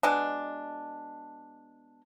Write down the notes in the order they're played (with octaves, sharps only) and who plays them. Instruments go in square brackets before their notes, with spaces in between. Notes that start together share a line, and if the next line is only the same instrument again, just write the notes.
[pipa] B2 G#3 D4